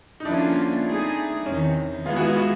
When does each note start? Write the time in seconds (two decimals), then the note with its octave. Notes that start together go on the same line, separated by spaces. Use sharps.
0.20 D#4
0.25 D3 F3 A#3 C#4 D4 E4 F4
0.86 A3 C4 D#4 G#4
1.45 E2 C3 D#3 C#4
2.05 D#3 G#3 B3 E4 F4 G#4
2.16 F#4
2.27 F4
2.37 F#4